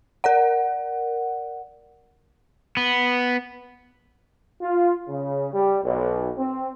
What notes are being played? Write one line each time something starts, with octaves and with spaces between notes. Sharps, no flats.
A#4 D5 F#5
B3
F4
C#3
G3
B1
C4